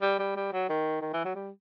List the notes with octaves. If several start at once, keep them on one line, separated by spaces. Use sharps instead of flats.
G3
G3
G3
F#3
D#3
D#3
E3
F#3
G3